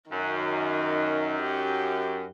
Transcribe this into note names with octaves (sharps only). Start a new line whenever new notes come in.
F#2 D#3
G4